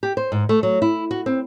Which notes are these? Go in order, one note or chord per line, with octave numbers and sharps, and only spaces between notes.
G4
C5
G#2
A3
F#3
E4
F#4
C4